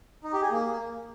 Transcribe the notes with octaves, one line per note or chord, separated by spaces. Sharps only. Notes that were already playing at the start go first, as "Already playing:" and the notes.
D#4
G4
G#4
A#3